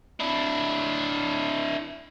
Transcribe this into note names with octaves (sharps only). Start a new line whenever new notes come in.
D4 E4